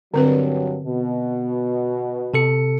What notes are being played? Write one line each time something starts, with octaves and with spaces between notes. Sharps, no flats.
G2 D3 F#3 C4 B4
B2
C3 A4 C#7